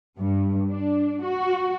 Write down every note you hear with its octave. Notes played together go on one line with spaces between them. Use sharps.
G2
D4
F#4